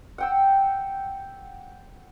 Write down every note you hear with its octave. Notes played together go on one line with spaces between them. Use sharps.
F#5 G5 E6